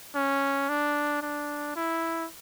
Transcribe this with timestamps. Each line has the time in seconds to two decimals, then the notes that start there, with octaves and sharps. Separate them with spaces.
0.15 C#4
0.69 D4
1.22 D4
1.76 E4